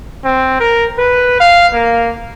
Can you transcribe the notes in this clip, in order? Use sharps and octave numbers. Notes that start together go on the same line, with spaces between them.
C4
A#4
B4
F5
A#3